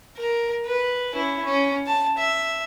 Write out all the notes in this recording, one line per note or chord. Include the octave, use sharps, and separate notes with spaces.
A#4
B4
C#4 E4
C#4
A5
E5